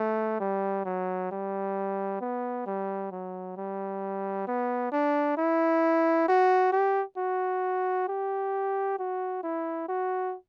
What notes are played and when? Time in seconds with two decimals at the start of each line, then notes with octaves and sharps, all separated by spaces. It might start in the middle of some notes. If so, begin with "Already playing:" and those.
Already playing: A3
0.40 G3
0.85 F#3
1.31 G3
2.21 B3
2.66 G3
3.12 F#3
3.57 G3
4.47 B3
4.92 D4
5.38 E4
6.28 F#4
6.72 G4
7.18 F#4
8.08 G4
8.99 F#4
9.43 E4
9.88 F#4